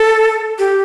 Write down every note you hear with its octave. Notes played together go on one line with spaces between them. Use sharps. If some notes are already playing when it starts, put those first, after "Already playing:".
Already playing: A4
G4